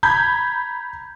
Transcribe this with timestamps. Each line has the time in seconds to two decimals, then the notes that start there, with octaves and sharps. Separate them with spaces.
0.03 A#5 B5 G6 G#6